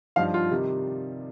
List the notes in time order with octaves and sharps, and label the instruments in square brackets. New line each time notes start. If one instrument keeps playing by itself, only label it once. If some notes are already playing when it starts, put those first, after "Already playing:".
[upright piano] G2 F3 D#4 F5
F4
C3 D#3 G3 D#4